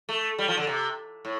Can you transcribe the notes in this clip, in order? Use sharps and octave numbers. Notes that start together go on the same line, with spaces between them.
A3
G3
F3
D3
C3
A2